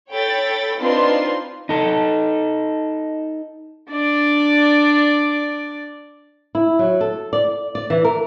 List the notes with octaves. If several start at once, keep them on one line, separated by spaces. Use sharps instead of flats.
A4 C#5 G5 B5 A6
C4 D4 D#4 F4 B4 C6
D#4 A4
D4 D5
E4
F#3
A4
D5
D5
E3
A#4